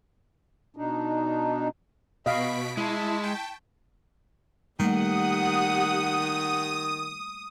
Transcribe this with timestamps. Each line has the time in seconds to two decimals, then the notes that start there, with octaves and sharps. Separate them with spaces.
0.77 B2 D4 D#4
2.26 B2 D#5 F5 B5 C#6 B6 D7
2.77 G#3 E4 A5 C#6 B6
3.23 G5
4.80 D#3 G3 A3 A#3 G4 F#5 D#6